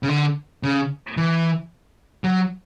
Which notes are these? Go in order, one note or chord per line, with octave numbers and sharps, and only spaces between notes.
C#3
D3
C#3
E3
F#3